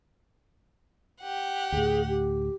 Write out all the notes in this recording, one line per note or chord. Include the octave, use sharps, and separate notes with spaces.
G4 F#5
D2 A2 G#4
G4